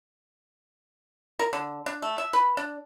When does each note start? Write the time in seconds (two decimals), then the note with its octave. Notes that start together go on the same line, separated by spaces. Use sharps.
1.39 A#4
1.53 D3
1.86 D4
2.02 A3
2.18 E5
2.33 B4
2.57 D4